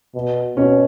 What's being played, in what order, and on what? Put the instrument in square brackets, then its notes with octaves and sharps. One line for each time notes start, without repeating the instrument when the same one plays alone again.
[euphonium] B2
[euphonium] B2 [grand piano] C#4